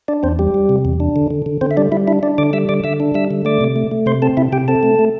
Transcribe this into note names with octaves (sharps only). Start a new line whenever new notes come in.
D4 D5
E2 C4 C5
G3 G4
G3
C3
E2
D4
D3
D3
D3
D3 C4 C5
E5
G3 D4 D5
G3 E4 E5
D4 E4 E5
D4 D5
D3 D5 D6
G3 E5 E6
D3 D5 D6
D3 E5 E6
D4
G3 E5 E6
D3
A3 D5 D6
C3
A3
A3
C3 C5 C6
C4 A4 A5
C3 E4 E5
C3 G4 G5
C4 A4 A5
A3
A3